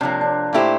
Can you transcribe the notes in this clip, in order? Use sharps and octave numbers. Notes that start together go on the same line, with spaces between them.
C3 F3 A#3 D4
D4
A#2 A3 E4 G4 C5